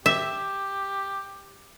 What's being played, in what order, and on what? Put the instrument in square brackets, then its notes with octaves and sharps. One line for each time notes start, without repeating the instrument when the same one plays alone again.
[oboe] G4 [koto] E5